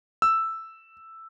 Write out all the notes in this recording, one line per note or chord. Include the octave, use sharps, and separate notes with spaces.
E6